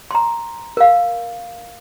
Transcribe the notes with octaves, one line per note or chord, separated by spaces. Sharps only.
A#5 C6
A#4 F5